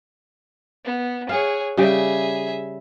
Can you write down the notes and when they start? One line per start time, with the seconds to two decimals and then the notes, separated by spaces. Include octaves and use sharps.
0.85 B3
1.29 G#4 C#5 F5 F#5
1.77 C#3 G3 G4 G#4 E5